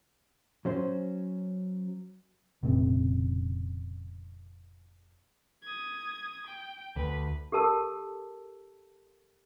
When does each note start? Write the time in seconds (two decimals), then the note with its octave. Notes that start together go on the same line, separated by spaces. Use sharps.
0.65 F#3 C#4 C5
2.63 F1 A#2 C#3 C4
5.63 D#6 G#6
6.46 G5
6.96 D2 B4
7.52 G4 A4 A#4 A5 E6